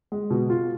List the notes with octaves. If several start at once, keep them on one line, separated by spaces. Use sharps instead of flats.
G#3
B2
F4